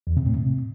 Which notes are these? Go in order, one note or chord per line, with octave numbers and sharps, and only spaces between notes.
E2
C3
A2
C3